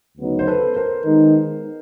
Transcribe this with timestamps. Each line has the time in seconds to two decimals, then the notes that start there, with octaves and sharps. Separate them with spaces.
0.18 D2 C#3 F#3 B3 D#4
0.39 C5
0.47 A4 B4
0.76 A#4 C5
1.05 D#3 G#3 B3 D#4